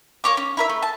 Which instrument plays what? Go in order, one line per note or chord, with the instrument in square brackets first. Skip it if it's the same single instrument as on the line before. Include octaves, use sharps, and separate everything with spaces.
[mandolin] A#3 C#5 D6
C#4
E4 A#4 E5
A3
A5